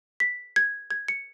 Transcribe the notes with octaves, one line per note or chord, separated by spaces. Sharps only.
B6
G#6
G#6
C#7